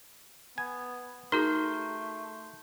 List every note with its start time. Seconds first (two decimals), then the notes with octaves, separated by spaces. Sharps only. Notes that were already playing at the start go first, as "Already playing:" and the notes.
0.58 B3 G#5
1.32 A3 D#4 F#4 G#4 A#4 C6 G6